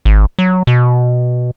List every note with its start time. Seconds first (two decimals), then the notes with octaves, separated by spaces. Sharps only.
0.05 G#1
0.39 F#3
0.67 B2